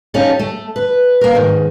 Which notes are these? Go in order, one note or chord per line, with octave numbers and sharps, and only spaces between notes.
C#4 D#4 F4 G4 A4
A3
B4
A#3 A#4
G#2 D#3